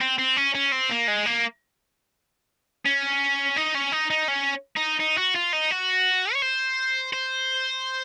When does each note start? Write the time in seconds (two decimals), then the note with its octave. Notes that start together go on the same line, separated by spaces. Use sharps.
0.01 C4
0.19 C4
0.37 C#4
0.55 C#4
0.72 C4
0.91 A#3
1.08 G#3
1.26 A#3
2.86 C#4
3.57 D#4
3.75 C#4
3.92 D#4
4.10 D#4
4.28 C#4
4.76 D#4
5.00 D#4
5.17 F#4
5.35 F4
5.53 D#4
5.71 F#4
6.33 C#5
6.42 C5
7.13 C5